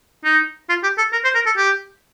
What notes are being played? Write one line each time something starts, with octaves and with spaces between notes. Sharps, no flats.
D#4
F4
G4
A4
A#4
C5
A#4
A4
G4